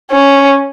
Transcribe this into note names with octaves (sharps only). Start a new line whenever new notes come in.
C#4